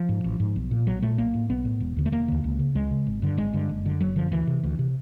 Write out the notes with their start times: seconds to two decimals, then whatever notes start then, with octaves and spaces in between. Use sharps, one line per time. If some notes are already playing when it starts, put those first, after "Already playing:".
Already playing: F3
0.09 G#2
0.24 A1
0.40 G#2
0.56 B1
0.71 A#2
0.87 B1 F#3
1.02 A#2 A3
1.18 B1 A#3
1.34 A2
1.50 B1 B3
1.65 A2
1.80 E1
1.97 D#2 D3
2.06 A3
2.12 E1 A#3
2.28 D#2 D3
2.44 C#2
2.59 C#3
2.75 C#2 G#3
2.91 C#3
3.07 G#1
3.22 G2 D3
3.37 G#1 G#3
3.53 G2 D3
3.69 F#1
3.85 F#2 D3
4.00 F#1 F#3
4.16 F#2 D3 F3
4.32 D2 E3
4.47 C3
4.63 D2
4.79 C3